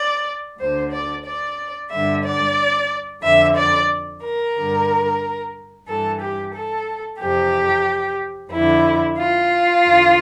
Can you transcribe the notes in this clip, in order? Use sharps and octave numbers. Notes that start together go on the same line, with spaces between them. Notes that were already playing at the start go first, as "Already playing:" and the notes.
Already playing: D5
D2 D3 C5
D5
D5
G2 D3 E5
D5
F2 D3 E5
D5
A#4
G2 D3
G2 E3 A4
G4
A4
F2 C3 E3 G4
F2 D3 E4
F4
E2 D3